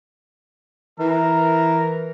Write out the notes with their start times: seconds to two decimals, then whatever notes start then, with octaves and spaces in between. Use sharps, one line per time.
1.00 E3 A#4